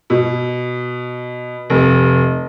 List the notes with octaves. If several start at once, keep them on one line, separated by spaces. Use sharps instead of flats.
B2
F1